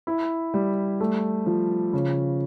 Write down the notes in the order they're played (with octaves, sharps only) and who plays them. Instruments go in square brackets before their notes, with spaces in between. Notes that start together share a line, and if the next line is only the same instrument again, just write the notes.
[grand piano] E4
G3
A3
F3
C#3